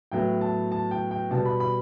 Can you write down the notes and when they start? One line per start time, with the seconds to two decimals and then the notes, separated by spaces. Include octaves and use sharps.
0.12 A2 F#3 B3 G5
0.41 A5
0.72 A5
0.91 G5
1.11 G5
1.31 B2 G3 B3 A5
1.45 B5
1.60 B5